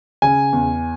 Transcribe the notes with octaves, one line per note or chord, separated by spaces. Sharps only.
C#3 G#5
E2